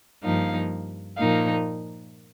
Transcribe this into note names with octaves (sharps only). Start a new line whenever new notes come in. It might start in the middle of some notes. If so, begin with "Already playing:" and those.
G2 F3 A#3 D#4 F5
A#2 F3 A#3 D#4 F5